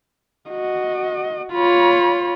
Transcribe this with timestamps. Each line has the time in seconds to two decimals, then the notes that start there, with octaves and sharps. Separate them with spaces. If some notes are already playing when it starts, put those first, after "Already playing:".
0.50 F#4 D#5
1.53 F4 C#5 B5